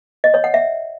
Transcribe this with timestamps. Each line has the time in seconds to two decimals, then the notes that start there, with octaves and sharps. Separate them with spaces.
0.24 D#5
0.34 C#5
0.44 F#5
0.54 E5